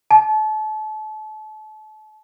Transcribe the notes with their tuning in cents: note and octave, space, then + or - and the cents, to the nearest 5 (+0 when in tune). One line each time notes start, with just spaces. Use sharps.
A5 -35